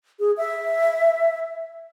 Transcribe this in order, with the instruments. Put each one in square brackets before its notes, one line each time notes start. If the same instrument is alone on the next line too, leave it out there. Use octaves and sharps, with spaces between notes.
[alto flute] G#4
E5